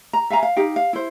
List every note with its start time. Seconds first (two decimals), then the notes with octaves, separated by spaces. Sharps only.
0.13 A#5
0.30 E5 F5 G#5 A#5
0.43 F5
0.56 D#4 G4 F5 G5
0.76 F5
0.93 E4 C5